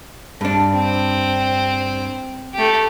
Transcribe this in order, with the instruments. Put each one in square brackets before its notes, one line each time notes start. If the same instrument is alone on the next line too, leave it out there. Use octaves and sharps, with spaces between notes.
[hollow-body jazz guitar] G2 D4
[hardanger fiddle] C4
A3 G4